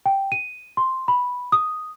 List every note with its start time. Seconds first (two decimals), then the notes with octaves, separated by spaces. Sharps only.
0.06 G5
0.32 D#7
0.77 C6
1.08 B5
1.52 D#6